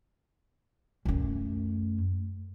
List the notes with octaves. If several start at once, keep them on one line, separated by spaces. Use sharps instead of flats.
F#2 A3